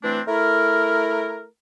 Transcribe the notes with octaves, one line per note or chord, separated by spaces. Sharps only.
E3 A3 C4 D4
A3 E4 A#4